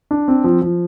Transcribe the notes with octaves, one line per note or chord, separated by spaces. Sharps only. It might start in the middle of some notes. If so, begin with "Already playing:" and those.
D4
C4
F3
F3